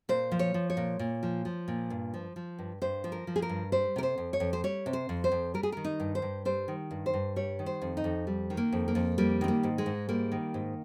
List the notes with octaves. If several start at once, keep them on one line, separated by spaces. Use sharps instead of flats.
A#2 C5
F3
C#5
F3
C#5
A#2
A#2
F3
F3
A#2
G2
F3
F3
G2
G2 C5
F3
A#4
F3
G#4
A#4
G2
G3 C5
C3 A#4
C5
F2
C#5
F2
C5
G3 C#5
C3
C5
F2
C5
F2
G3 A#4
G#4
D#3 A#4
D#4
G2
C5
G2
G3 C5
D#3
G2
C5
G2
G3 C#5
D#3
C5
F2
D#4
F2
G3
D#3
A#3
F2
A#3
F2
G3 A#3
D#3 C4
A#3
G#2
G#3
G#2
G3 A#3
D#3
G#2